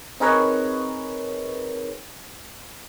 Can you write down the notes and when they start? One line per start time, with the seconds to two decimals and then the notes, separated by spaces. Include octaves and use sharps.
0.20 C4 D#4 G#4 A#4 B4 C#5